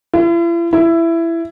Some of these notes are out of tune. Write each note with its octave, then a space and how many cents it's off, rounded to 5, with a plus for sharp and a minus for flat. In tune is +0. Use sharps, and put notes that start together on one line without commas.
E4 +45
E4 +15